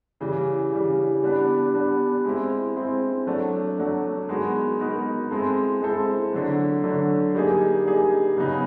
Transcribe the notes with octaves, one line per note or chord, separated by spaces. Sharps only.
C#3 E3 G3
C#3 E3 G3
G3 B3 D4
G3 B3 D4
G#3 C4 E4
G#3 C4 E4
F#3 A3 D4
F#3 A3 D4
G#3 B3 D#4 F#4 A#4
G#3 B3 D#4 F#4 A#4
G#3 C4 E4 A4 C5
G#3 C4 E4 A4 C5
D3 F#3 A3
D3 F#3 A3
G3 A#3 D#4 G#4
G3 A#3 D#4 G#4
C#3 F#3 B3 D#4